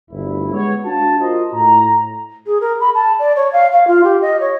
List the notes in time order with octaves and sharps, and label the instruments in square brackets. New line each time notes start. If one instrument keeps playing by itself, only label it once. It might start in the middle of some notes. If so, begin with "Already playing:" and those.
[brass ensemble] G1 D2 E4
G#3 B3 C#5
D4 F#4 F5 A5
F4 F#4 A#4 C5 D#5
A2 A#5
[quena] G#4
A#4
B5
A5
D5
C#5
F5
F5
F4
G4
D#5
C#5